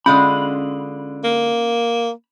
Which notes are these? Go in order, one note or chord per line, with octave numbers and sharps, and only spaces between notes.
D3 G#3 C#4 F4 B5
A#3